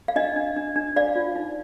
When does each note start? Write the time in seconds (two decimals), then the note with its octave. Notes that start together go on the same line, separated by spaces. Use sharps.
0.08 F5
0.16 D4 D#5
0.36 D4
0.56 D4
0.76 D4
0.96 C5 D5 F5
1.16 F4
1.36 D#4